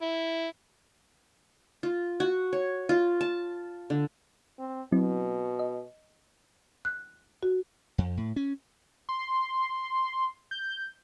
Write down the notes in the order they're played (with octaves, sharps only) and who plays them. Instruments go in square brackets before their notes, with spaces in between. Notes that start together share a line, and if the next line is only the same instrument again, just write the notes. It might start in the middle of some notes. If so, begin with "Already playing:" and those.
[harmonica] E4
[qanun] F4
F#4
C#5
F4
A5
D3
[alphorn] C4
[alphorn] B2 [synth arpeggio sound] F#3 C4 E4
[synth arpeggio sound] D#5
[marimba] F#6
F#4
[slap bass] F2
A2
C#4
[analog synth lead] C6
G6